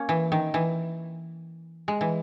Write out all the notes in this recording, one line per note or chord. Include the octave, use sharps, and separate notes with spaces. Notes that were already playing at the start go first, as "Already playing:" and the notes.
Already playing: A#3 C#4
E3
D#3
E3
G#3
E3